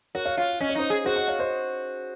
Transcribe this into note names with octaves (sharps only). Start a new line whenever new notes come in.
F#4 A#4 C#5
C#5 F5
F4 C#5 F5
C#4 D#5
C#5
D#4 C5 D#5
G#4
F#4 C5 D#5
D#5 F#5
C#5 F5
C5 D#5